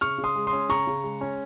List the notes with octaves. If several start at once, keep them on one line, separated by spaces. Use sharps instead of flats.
C#3 C#6 F6
C#3
C6 D#6
G#3
C6 D#6
C#4
C#3 A#5 C#6
C#3
G#3
C#4